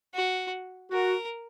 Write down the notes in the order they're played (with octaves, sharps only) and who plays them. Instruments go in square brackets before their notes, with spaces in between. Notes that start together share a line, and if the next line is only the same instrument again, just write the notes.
[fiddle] F#4
[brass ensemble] F#4 [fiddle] A#4